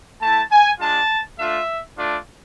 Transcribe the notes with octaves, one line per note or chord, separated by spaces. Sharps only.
A3 E4 A5
G#5
G#3 D4 F4 A5
A3 D4 F4 E5
A3 D4 F4 D5